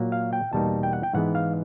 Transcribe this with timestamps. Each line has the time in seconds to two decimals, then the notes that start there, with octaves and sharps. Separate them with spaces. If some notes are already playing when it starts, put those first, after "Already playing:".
Already playing: A#2 F#3 A#3
0.12 F5
0.33 G5
0.53 E2 B2 G3 A#3 D#4 A5
0.83 G5
0.93 F#5
1.03 G5
1.13 G#2 E3 G#3 B3 F#5
1.35 F5